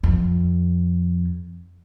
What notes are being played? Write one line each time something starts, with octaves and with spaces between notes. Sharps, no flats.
F2